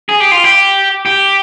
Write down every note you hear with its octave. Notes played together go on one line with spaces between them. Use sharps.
G#4
G4
F4
G4
G4